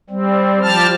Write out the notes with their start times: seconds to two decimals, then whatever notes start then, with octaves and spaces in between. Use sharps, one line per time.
0.10 G3 C4
0.62 F3 G4 A5 F6